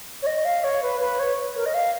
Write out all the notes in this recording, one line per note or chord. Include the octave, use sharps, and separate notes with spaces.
C#5
D#5
F5
C#5
B4
B4
C#5
A#4
D#5
F5